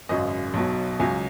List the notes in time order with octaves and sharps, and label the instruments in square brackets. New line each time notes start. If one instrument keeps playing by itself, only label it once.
[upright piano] G#1 F#2 C#3 F#3 D#5
B1 B2 F#3
C#2 C#3 F#3 G#5